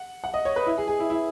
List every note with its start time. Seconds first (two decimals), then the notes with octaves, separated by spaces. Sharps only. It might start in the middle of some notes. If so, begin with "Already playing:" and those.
Already playing: F#5
0.24 F#5
0.34 D#5
0.45 C#5
0.56 B4
0.66 E4
0.78 G#4
0.88 G#4
1.00 E4
1.10 E4